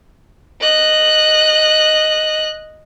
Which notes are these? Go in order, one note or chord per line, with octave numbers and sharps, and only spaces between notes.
D#5 F#6